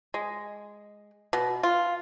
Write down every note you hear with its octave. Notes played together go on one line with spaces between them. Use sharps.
G#3
B2
F4